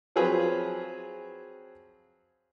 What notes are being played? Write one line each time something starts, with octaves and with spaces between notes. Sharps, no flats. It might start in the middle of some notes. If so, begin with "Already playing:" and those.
F3 F#3 C4 G#4 B4